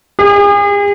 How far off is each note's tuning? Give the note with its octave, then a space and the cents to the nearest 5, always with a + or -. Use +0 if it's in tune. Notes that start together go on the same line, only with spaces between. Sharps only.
G#4 -40